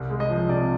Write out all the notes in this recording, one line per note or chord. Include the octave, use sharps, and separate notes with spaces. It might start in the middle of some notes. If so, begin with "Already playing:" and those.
Already playing: C2 G3
G#3
D#5
F3
C3 D5